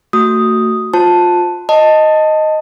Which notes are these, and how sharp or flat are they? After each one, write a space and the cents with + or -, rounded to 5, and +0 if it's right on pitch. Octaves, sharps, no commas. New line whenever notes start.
A3 +35 F#4 +0 D#6 +0
F4 +20 C5 -10 A5 +0
D#5 +0 A5 +10